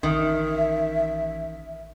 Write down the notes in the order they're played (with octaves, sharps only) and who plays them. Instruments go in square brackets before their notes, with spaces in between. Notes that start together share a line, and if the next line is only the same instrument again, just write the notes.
[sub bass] A1 [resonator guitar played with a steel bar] D#3 [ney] E5